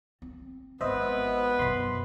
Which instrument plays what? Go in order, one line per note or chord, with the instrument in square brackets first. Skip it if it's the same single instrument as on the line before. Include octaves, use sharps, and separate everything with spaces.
[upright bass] C4
[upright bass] G#1 [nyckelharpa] B3 B4 [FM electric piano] C5 D#5 E5
[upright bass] F#2 B2 [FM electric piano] B5 C6